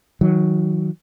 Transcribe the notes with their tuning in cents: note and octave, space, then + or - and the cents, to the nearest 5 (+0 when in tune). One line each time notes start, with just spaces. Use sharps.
D#3 +35 F#3 +0